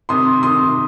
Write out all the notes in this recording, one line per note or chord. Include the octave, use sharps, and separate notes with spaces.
C3 D#3 C6 D#6
C3 D#3 C6 D#6